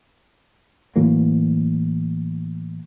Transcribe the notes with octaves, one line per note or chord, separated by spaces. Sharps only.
A2 E3 F#3 A#3